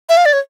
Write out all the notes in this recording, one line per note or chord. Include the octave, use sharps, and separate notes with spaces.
E5
F5
D5
C#5